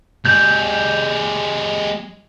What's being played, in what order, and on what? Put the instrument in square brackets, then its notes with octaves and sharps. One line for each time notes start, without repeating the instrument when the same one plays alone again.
[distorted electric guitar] G#3 G4 [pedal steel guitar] G6